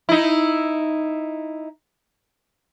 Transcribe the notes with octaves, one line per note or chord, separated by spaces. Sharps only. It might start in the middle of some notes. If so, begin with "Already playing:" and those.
D#4 E4